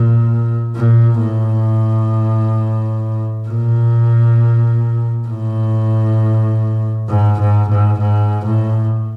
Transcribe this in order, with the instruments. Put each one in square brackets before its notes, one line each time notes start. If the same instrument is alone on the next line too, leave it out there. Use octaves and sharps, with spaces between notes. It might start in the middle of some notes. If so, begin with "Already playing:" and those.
Already playing: [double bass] A#2
A#2
A2
A#2
A2
G#2
G#2
G#2
G#2
A2